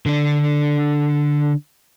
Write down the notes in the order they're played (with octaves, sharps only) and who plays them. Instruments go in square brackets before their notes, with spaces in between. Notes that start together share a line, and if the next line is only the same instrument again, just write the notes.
[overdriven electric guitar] D3 D4